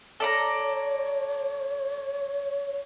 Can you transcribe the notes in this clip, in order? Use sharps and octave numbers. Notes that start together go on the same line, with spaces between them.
A4 C#5 D5 A#5